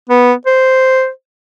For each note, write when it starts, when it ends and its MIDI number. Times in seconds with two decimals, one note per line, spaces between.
0.09 0.33 59
0.46 1.09 72